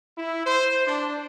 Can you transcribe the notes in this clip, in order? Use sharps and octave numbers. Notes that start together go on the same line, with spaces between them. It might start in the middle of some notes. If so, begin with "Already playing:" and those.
E4
C5
D4